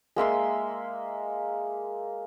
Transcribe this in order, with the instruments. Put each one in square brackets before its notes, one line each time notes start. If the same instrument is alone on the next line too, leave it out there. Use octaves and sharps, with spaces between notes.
[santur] G#3 A#3 E5 C6